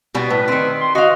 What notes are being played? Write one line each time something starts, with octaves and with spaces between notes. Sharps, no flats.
B2 G3 B3
A2 B4
D#3 C4
C6
F#4 D#5 F5